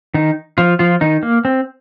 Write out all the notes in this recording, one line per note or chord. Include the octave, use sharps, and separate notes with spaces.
D#3 D#4
F3 F4
F3 F4
D#3 D#4
A#3
C4